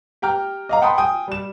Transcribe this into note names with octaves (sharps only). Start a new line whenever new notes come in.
G4 G5 A#5 F6
D#5 F5 A#5
F#5 G5 A5 B5 C6 D#6
G5 G#5 D#6
G3 E7